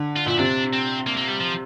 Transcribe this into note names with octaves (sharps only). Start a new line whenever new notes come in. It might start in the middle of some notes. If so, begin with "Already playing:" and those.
Already playing: D3
F4
A#2 E4
C3 D4
C4
A#3
A#3
G3
F3